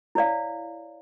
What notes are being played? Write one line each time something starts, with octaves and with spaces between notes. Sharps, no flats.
E4 C#5 D5 F5